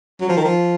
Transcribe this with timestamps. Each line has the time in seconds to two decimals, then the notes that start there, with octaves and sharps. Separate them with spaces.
0.21 F#3
0.29 F3
0.37 D#3
0.44 F3